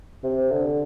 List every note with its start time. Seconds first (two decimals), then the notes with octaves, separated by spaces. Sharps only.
0.23 C3
0.51 D3